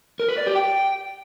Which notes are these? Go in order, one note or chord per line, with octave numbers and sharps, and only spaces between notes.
A#4
B4
D5
G4
G5